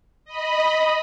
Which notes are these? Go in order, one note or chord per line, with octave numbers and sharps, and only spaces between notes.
D#5 B5